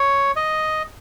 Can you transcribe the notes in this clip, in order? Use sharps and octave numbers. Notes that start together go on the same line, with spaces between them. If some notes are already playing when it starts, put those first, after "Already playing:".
Already playing: C#5
D#5